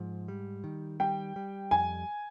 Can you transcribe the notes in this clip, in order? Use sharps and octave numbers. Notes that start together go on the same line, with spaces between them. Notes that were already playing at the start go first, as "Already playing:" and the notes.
Already playing: G#2 F3
G3
D#3
G3 G5
G3
F2 G#5